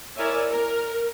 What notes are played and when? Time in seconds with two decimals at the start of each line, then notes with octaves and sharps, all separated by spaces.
0.16 E4 A#4 C#5 D5 E5 G#5
0.49 A#4